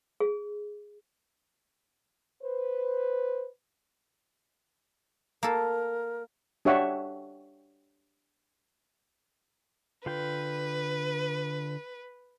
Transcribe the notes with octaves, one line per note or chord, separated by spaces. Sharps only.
G#4
B4 C5
A#3 A4 A#4
D4 G4 C#5 E5 F#5
D3 F4 B4 G5